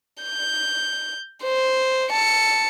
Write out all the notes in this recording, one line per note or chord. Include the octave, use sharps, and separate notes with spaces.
G6
C5
A5 C#7